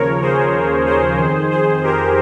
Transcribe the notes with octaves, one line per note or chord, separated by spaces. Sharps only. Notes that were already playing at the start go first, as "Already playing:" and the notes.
Already playing: D#2 C#3 F3 A#4 C#5
G#4 C5
G#4 C5
F2 D#3
G#4 C5
G4 A#4